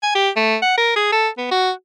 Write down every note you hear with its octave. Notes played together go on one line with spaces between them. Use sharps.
G#5
G4
A3
F#5
A#4
G#4
A4
B3
F#4